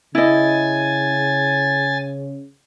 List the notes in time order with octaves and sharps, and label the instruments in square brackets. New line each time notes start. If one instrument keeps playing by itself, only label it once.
[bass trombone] C#3 [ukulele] E4 D#5 [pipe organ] G#5 A6